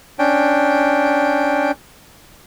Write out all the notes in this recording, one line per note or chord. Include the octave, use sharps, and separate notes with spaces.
C#4 D4 G5